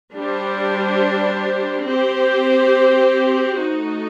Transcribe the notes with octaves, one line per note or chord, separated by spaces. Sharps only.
G3 D4 G4 C5
C4 G4 C5
A3 D#4 F#4